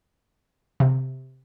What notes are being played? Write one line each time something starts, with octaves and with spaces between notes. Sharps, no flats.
C3